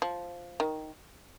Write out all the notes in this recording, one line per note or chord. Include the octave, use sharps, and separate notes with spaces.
F3
D#3